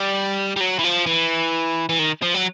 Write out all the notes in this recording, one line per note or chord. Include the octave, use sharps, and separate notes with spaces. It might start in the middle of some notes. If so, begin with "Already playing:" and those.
Already playing: G3
G3
F#3
E3
F3
E3
E3
D#3
F3
F#3